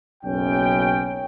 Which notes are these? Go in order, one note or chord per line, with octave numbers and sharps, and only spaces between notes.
F#1 B1 F#2 C#4 G5